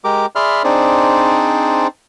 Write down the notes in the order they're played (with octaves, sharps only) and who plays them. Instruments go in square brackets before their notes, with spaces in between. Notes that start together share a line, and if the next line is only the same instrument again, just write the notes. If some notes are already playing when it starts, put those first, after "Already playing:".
[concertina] G#3 G4 A#4 D6
G#4 D5 E5 B5 C6 F6
C4 D4 D#4 G#4 C5 D5